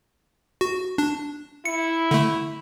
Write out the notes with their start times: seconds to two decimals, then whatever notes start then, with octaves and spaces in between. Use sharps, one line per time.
0.61 F#4
0.98 D4
1.65 E4 C#7
2.11 D3 A3